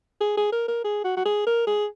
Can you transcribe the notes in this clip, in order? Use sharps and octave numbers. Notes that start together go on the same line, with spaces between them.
G#4
G#4
A#4
A#4
G#4
F#4
F#4
G#4
A#4
G#4